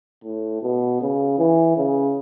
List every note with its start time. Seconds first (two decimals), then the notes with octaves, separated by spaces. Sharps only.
0.24 A2
0.62 B2
1.01 C#3
1.38 E3
1.76 C#3